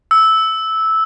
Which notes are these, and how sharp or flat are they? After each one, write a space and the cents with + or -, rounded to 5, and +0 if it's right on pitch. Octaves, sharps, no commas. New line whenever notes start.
E6 -10